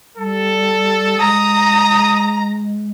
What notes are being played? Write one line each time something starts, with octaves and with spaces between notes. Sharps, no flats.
G3 A4
G#3 A#5 D#6